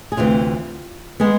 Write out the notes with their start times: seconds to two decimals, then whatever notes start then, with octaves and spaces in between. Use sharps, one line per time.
0.12 G#4
0.17 D2 C3 E3 F4
1.20 G#3 B3 G#4